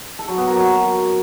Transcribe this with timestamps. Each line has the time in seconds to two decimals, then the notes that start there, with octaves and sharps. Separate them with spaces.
0.19 A4
0.28 F#3
0.38 B3
0.47 A#4
0.56 F#3